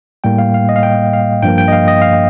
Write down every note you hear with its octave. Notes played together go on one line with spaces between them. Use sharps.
A2 G3 A#3 G5
F5
F5
D#5
F5
G5
F5
G2 F3 A#3 G5
G5
D#5
F5
D#5
F5